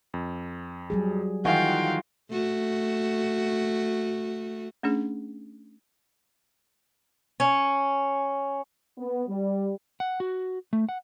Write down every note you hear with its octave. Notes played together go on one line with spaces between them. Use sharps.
F2
F#3 G3 G#4
D#3 E3 D#4 F4 F#4 F5 G5 G#5
A3 F#4
A3 C#4 D4 G#4
C#4
B3
G3
F#5
F#4
A3
F#5